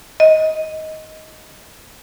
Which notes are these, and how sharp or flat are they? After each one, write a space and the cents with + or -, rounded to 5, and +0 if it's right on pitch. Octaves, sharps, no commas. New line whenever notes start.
D#5 +10